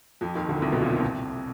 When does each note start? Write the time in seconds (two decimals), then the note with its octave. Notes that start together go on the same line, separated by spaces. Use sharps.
0.21 F2 F3
0.35 D#2 D#3
0.49 D2 D3
0.62 C2 C3
0.72 B1 B2
0.82 A#2
0.92 A#2
1.02 C2 C3